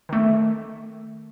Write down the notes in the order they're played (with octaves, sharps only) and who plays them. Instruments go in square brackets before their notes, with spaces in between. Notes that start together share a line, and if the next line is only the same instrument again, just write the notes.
[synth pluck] D#3 A3